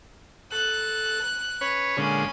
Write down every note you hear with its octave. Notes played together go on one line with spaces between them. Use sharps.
A4 F#6
C#4 B4 C#5
A#2 D3 G#3 C#4 B5